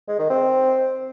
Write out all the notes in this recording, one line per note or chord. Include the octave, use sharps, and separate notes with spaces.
G#3
D#3
C4